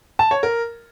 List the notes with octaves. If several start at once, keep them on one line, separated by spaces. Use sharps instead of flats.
A5
C#5
A#4